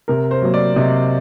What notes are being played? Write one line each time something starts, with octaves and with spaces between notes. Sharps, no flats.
C3 A#4
C5
F#3 A#3
D5
C3 D#5